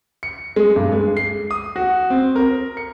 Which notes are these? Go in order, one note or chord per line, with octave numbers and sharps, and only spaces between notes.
C#7
G#3
G2
G#3
C7
D#6
F#4
C4
A#4
C#7